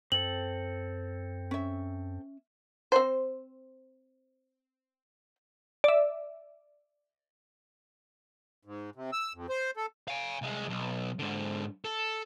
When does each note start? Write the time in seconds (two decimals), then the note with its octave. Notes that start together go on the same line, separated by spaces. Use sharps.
0.12 F#2 C4 A4 F#7
1.51 C#4 E5
2.92 C4 C5
5.84 D5 E5
8.65 G#2
8.95 C3
9.13 E6
9.34 F2
9.49 C5
9.77 A4
10.08 F5 G#5
10.42 C2 G#3
10.69 B1
11.19 G#2 D3
11.84 A4